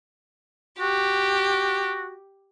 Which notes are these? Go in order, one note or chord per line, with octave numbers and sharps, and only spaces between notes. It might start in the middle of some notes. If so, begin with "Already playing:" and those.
F#4 G4